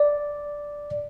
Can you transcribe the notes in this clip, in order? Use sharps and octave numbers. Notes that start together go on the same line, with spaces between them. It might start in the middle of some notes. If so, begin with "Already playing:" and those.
Already playing: D5